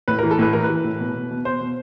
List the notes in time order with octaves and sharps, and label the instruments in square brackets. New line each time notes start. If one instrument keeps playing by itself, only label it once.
[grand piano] A2 B4
E3 A#4
A4
A2 B4
E3 A#4
B4
E3
A2
B2
B2
B2
B2 C5
B2